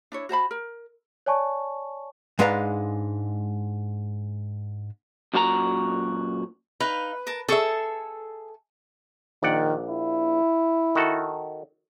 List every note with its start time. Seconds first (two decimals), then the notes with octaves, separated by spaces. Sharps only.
0.12 D4 E4 C#5
0.29 F#4 C5 A5 B5
0.51 A#4
1.26 C#5 D5 G#5 A5 C#6
2.39 G#2 G#3 D4 B4 F5 A#5
5.34 F#2 A#2 F#4 A#4 A#5
6.80 D#4 B4 F5
7.27 A#4 A5
7.48 G#4 A4 E5 A5 C#6
9.43 A#1 D#3 D5 F#5
9.89 E4
10.95 D#3 F#4 A4